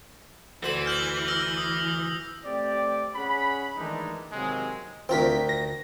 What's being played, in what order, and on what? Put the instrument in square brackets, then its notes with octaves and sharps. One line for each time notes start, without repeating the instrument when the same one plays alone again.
[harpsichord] D2 C5 B5 [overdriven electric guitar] E3
[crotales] F6 G6 F#7
E6 F6 A#6
D#6
[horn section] A3 C4 G4 D5
C#4 G#4 F#5 B5
D#3 E3 G#3 A3 D4 D#4
C3 D#3 F#3 G#3 A#3 C4
[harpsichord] D2 A#4 G5 [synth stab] C4 F4 B6
[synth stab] A#6